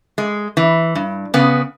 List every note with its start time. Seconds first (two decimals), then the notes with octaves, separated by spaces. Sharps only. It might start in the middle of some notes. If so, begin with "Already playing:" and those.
0.18 G#3
0.57 E3
0.95 G2
1.34 C#3 B3